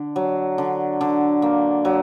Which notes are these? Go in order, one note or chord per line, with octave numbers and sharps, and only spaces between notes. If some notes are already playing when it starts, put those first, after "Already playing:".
Already playing: D3
F#3
D3
D3
A#3
F#3